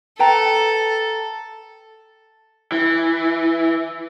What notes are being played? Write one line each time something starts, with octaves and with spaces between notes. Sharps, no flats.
A4 B4 G5 A#5
E3